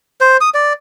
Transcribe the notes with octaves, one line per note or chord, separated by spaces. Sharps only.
C5
D#6
D5